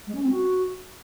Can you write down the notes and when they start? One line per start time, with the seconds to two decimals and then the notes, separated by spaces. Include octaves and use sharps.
0.07 G#3
0.15 C#4
0.23 C4
0.30 F#4